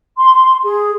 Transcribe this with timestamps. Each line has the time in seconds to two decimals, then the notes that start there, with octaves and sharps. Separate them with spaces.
0.18 C6
0.63 G#4